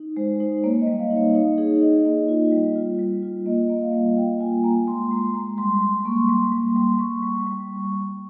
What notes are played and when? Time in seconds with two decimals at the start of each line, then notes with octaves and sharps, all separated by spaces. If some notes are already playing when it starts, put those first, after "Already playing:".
Already playing: D#4
0.17 G#3 C5
0.40 D#4 C5
0.63 A#3 C#5
0.81 D#5
0.87 G3
0.99 F5
1.11 D#4
1.17 C#5
1.34 D#4 C#5
1.58 D#4 G#4
1.81 D#4 D#5
2.05 A#3
2.28 F4
2.52 G3
2.76 F4
2.99 G3
3.23 F4
3.46 A#3 D#5
3.70 A#3
3.82 F5
3.93 G3
4.17 F4 G5
4.40 F4 G#5
4.64 A#3 A#5
4.87 G#3 C6
5.11 G#3 A#5
5.34 G#3 A#5
5.58 G3 C6
5.82 G3 C6
6.05 A#3 C#6
6.29 G3 C6
6.52 G3
6.76 G3 C6
6.99 G3 C#6
7.23 G3
7.46 G3